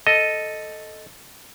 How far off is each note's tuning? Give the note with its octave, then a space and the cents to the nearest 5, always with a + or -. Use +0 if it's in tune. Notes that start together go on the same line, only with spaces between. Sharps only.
A4 +0 D#5 +0